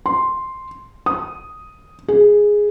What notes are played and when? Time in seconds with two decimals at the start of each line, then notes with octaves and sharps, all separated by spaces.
0.06 C6
1.06 D#6
2.08 G#4